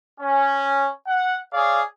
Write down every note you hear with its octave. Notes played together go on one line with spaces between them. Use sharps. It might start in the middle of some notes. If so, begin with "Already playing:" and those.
C#4
F#5
G#4 C#5 D5 F5